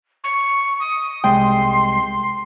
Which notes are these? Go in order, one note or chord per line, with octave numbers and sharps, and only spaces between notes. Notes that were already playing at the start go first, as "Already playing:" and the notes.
C#6
D#6
C2 G#3 G5 C6